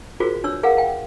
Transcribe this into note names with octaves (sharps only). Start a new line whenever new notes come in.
F4 F#4 G#4 A#4 C5
D4 B4 C#5 E6
G#4 A#4 B4 F5 F#5
F5 G5